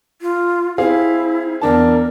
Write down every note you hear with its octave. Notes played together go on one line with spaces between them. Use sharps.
F4
C4 E4 G#4 F5
E2 D4 A#4 A5